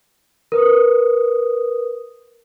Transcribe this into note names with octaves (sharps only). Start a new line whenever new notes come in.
A#4 B4 D#6